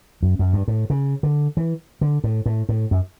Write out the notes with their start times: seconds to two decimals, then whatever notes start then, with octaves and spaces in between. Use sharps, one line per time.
0.22 F#2
0.39 F#2
0.53 G2
0.68 A2
0.90 C#3
1.23 D3
1.57 E3
2.01 D3
2.24 A2
2.46 A2
2.69 A2
2.91 F#2